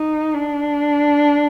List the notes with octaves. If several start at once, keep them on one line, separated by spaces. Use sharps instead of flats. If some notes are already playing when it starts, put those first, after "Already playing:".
Already playing: D#4
D4